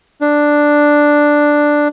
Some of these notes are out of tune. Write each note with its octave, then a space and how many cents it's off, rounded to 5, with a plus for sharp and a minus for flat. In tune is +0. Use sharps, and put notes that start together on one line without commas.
D4 +5